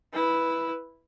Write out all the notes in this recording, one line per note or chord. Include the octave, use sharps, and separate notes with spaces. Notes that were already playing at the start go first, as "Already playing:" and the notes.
E4 B4